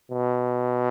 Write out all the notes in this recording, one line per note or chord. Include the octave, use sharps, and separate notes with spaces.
B2